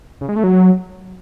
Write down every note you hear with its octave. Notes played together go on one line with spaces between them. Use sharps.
C#3
G#3
A3
F#3